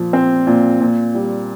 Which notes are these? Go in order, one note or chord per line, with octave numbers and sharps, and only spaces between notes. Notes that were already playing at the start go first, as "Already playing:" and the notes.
Already playing: A#2 F3
C4
A#2
A#2
G3